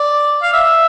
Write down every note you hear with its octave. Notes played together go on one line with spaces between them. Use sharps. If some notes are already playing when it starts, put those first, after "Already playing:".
Already playing: D5
F5
E5